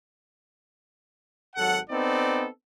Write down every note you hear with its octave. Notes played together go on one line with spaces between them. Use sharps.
G#1 F#3 A4 F#5
B3 C4 D#4 A4 D5